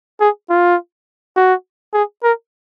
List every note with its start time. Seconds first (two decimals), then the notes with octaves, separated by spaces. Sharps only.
0.20 G#4
0.50 F4
1.36 F#4
1.94 G#4
2.23 A#4